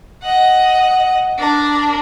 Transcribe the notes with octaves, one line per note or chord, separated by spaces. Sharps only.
D#5 F#5
D4 A#4